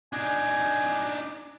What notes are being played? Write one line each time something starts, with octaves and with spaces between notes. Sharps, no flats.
D4 D#4 G#5